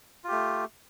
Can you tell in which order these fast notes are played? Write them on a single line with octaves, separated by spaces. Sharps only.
F4 G4 A3